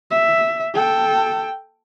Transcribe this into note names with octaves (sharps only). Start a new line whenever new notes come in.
E5
A4 G5